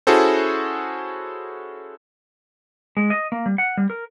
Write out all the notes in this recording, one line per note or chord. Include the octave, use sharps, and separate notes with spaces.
C#4 E4 F#4 G#4 A4 C5
G#3
D#5
A#3
G3
F#5
G3
A#4